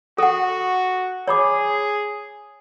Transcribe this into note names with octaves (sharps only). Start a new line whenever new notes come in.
F#4 A4 F#5
G#4 C#5 B5 D6